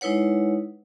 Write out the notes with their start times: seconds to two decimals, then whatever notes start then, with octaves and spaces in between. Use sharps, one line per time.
0.01 G#3 D#4 E4 B4 C#5 F#5